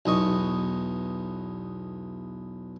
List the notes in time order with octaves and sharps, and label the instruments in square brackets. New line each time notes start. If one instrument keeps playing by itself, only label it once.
[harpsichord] B1 E2 D#5 C#6